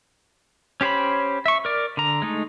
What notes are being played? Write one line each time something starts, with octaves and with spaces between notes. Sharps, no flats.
C#4 G4 C5 C#5 B5
E5 C#6
A#4 D5
D3 A#5
G#3 A3 D#4